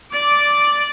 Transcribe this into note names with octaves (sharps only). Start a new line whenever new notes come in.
D5 D6